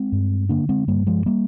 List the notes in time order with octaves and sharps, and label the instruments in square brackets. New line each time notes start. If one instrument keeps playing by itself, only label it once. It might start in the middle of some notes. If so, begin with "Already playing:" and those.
Already playing: [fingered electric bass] G#3 C4
G2
D3 A#3 D4
G#3 C4
G2 G3 A#3
F3 G#3
G3 A#3